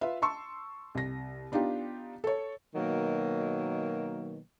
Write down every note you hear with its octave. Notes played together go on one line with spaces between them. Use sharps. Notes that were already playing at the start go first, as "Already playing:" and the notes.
F4 B4 E5 F5
A5 C6 C#6 E6
C2 A#6
B3 D4 D#4 F4 G4
A4 C#5
B2 D#3 F#3 A#3